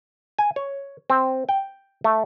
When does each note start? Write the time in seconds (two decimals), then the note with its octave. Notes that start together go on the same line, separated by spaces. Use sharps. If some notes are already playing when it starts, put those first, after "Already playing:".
0.39 G#5
0.56 C#5
1.10 C4
1.49 G5
2.04 A3